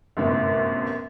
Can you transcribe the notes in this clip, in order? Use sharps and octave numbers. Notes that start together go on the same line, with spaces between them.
G1 F#2 A2 C3